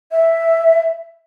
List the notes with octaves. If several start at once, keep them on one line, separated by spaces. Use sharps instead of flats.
E5